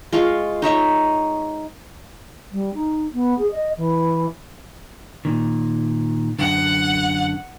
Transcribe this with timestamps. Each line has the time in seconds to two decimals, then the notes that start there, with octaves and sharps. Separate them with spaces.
0.13 G#3 F4 F5 C#6
0.62 D#4 C#5 E5 C#6
2.51 G3
2.74 D#4
3.14 B3
3.38 G#4
3.51 D#5
3.77 E3
5.25 A#2 D#3
6.39 F#2 D3 F#5